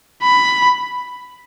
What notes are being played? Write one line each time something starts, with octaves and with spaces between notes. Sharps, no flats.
B5